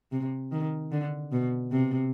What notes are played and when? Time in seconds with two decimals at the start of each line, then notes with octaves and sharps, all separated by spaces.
0.12 C3
0.52 D#3
0.92 D3
1.32 B2
1.72 C3